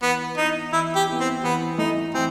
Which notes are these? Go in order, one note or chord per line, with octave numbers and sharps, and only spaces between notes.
E3 B3
B3 D#4 E4
E3 E4
G4
B3 E4
C4
E3 B3
A3 D#4 E4
E3 C4